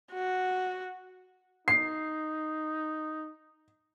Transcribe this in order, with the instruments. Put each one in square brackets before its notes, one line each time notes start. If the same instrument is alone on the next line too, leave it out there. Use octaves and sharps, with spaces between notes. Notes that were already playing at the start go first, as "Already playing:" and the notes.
[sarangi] F#4
[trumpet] D#4 [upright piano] C7